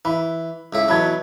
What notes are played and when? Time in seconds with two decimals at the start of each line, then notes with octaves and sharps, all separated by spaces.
0.05 E3 B5
0.73 C#2 A2 E4
0.89 B2 E3 F#3 A5 B5 G#6